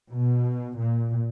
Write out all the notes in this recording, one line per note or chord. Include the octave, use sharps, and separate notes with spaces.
B2
A#2